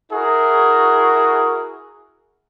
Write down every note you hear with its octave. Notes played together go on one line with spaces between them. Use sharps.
E4 F#4 G#4 A#4